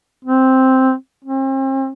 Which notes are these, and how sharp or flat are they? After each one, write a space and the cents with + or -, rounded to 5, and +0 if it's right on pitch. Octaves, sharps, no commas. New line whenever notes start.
C4 +0
C4 +40